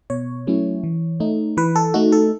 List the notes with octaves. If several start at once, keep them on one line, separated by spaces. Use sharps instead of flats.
B2 C#5
F#3 A3 C#4 E4
E3
A3 D#4
E3 B4
A4
A3 D#4 F#4
A4